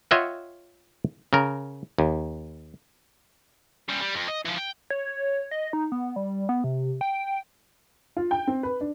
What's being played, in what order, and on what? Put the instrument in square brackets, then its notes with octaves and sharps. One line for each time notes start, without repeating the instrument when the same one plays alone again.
[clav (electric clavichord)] F4 C#5 D#5 E5 F#5 G5
C#3 A#4
D#2
[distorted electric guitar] C#3 G3
G3
F2
D#5
E3 F3
G5
[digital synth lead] C#5
D#5
D#4
B3
G3
B3
C3
G5
[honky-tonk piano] F4
G5
C4
B4
D4